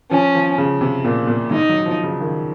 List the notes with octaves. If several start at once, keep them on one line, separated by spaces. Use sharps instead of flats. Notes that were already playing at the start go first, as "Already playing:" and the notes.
F3 C#4
F3
C#3
C3
A#2
A#2
G#2 D#4
F#3
F3
C#3
D#3